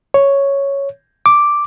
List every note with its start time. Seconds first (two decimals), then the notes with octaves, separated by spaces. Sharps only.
0.14 C#5
1.26 D6